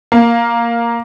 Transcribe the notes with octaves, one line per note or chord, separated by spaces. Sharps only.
A#3